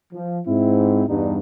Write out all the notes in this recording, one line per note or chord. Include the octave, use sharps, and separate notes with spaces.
F3
G#2 C4 E4
E2 G2 G3 B3 D4 D#4